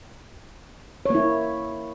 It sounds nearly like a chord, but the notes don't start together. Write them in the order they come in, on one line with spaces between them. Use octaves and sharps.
C#5 A#3 E4